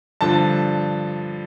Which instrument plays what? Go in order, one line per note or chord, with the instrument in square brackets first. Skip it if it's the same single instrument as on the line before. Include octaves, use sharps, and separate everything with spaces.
[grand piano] G2 D3 F3 A5